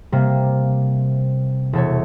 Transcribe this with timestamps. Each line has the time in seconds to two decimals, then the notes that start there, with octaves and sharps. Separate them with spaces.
0.12 C3 G3 A#3
1.73 E1 A4 C#5